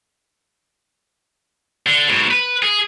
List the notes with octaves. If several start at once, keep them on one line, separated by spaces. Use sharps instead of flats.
D3
G#2 B2
B4
G#4